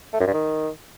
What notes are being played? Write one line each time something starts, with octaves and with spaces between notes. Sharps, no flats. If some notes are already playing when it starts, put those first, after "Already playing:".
A3
F#2
G2
D#3